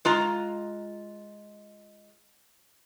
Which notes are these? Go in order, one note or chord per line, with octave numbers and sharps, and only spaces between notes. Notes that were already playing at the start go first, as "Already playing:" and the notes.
G#3 F4 A#5